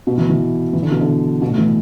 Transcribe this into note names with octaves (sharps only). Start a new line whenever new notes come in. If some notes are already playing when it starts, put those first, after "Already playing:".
B2
E3
E3
E3
D3
B2
D3
B2
A2
E3